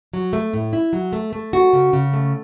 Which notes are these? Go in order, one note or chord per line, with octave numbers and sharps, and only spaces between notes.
F#3
A3
A2
E4
F#3
A3
A3
F#4
C#3
C#3
A3